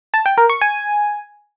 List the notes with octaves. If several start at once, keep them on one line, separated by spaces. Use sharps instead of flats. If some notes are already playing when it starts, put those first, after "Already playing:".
A5
G5
A#4
C#6
G#5